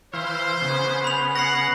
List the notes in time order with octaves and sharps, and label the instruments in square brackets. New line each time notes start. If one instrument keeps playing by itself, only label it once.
[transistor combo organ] E3 F5 [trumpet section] C5
[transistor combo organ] C#3 B3
[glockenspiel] B5 F7
[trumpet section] F#5 [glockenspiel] A#6 C7